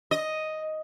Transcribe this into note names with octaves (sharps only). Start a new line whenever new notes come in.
D#5